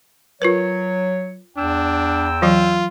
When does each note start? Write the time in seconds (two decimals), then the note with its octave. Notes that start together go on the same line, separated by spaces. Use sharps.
0.42 F#3 F4 A#4 B4 C#5
1.57 E2 D4 G5 E6
2.42 E3 F#3 F4